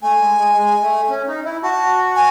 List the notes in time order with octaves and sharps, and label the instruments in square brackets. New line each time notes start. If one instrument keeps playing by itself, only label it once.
[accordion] A3 [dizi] G#5
[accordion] G#3
G#3
G#3
A3
C#4
D#4
E4
[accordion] F#4 [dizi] A5
[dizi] G#5